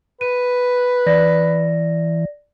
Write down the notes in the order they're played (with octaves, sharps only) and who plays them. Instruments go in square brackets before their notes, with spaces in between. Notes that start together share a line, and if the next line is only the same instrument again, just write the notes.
[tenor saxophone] B4 [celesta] D#7
[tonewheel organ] E3 [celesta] D5 A#6